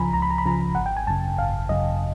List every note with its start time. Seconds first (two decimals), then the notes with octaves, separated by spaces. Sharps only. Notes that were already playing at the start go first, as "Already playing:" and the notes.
Already playing: C#2 C#3 F3 G#5 A#5 B5
0.13 C#2 A#5
0.22 B5
0.30 A#5
0.38 B5
0.46 C#3 F3 A#5
0.75 G#1 F#5
0.86 G5
0.97 G#5
1.07 F#2 C#3 A5
1.38 G#1 F5
1.69 F#2 C#3 D#5